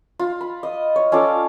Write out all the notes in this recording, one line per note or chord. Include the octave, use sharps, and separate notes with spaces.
F4
B5
D#5
C#5
C#4 F4 A4 D5